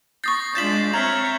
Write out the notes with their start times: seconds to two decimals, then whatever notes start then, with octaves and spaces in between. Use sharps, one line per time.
0.24 C#6 D#6 G6 A6 A#6 C7
0.55 G#3 D4 F4 G6 A6 B6 E7 F#7
0.94 C4 C#5 E5 A#5 F6 G#6